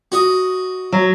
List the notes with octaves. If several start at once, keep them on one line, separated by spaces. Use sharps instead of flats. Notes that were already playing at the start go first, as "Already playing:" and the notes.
F#4 D#5
F#3